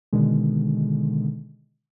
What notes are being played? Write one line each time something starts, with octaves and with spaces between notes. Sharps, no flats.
B2 D3 D#3 G#3